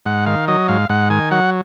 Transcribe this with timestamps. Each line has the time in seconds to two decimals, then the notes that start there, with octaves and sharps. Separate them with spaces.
0.06 G#2 F#5
0.26 D#3 F5
0.48 F#3 D#5
0.68 G#2 F5
0.89 G#2 F#5
1.10 D#3 G#5
1.31 F#3 F#5